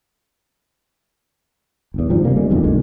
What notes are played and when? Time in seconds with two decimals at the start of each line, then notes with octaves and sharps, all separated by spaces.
1.94 G1 E2
2.09 G2 D#3 F3 G3
2.24 C3 G3 A#3
2.36 D2 G3 G#3
2.50 E1 F2 A#2 D#3
2.63 B1 D3 D#3 G#3